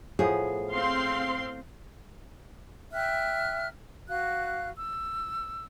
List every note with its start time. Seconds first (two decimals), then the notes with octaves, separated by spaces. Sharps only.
0.19 A2 F3 B3 G#4
0.72 C4 F5 C6
2.93 E5 G5 F6 F#6
4.08 F#4 F5 F#6
4.75 E6